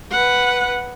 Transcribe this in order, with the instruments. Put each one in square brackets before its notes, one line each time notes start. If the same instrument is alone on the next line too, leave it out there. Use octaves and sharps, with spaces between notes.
[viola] B4 F#5